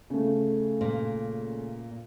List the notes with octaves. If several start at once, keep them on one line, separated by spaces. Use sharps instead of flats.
C#3 A3
A#2